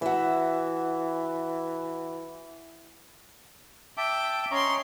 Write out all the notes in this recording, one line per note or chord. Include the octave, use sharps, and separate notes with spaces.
E3 F#4 E5
E5 G5 A5 D6
C#4 D#5 A#5 C6 C#6